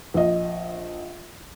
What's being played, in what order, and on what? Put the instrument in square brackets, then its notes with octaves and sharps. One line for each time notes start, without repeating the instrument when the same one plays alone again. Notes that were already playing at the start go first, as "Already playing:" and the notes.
[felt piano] A#1 D#5